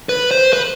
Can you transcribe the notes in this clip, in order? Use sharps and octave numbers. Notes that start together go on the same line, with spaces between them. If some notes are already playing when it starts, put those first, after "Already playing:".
B4
C5
B4